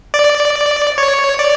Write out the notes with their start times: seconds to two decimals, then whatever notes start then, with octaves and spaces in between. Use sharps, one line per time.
0.14 D5
0.98 C#5
1.39 D5